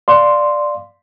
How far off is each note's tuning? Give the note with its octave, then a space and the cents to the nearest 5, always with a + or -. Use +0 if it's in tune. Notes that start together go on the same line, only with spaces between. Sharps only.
D5 +5 F5 +0 C6 +0